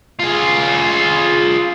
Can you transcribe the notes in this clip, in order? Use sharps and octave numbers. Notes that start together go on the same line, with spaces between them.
F4 G#4